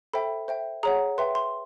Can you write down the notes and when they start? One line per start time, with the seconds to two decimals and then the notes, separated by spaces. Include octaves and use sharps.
0.13 A4 C5 E5 G5 B5
0.48 C5 E5 G5
0.83 G#4 C#5 F#5 A#5
1.18 B4 E5 G5 C6
1.35 C6